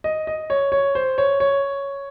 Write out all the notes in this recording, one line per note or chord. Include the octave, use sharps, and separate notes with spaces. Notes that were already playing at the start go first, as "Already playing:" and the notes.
D#5
D#5
C#5
C#5
C5
C#5
C#5